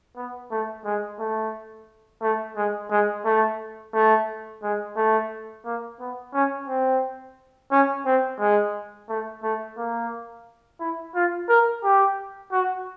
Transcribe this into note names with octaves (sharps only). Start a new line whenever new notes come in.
B3
A3
G#3
A3
A3
G#3
G#3
A3
A3
G#3
A3
A#3
B3
C#4
C4
C#4
C4
G#3
A3
A3
A#3
E4
F4
A#4
G4
F#4